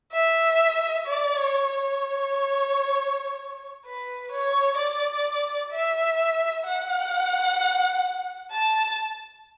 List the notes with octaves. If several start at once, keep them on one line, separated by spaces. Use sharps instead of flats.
E5
D5
C#5
C#5
B4
C#5
D5
E5
F#5
A5